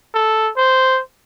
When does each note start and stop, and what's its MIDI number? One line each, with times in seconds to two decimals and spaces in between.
0.14 0.50 69
0.57 1.01 72